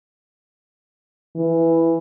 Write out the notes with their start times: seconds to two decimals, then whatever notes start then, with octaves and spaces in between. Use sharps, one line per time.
1.36 E3